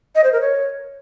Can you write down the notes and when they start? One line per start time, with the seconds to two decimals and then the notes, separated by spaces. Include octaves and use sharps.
0.15 D#5
0.24 C5
0.33 A#4
0.41 C#5